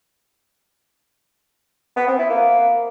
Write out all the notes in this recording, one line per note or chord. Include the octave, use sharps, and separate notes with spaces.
B3
C4
E4
A#3